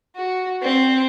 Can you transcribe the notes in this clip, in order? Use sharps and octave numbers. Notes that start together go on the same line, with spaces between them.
F#4
C4